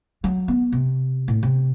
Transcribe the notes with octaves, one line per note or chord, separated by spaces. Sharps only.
F#3
B3
C3
A2
C3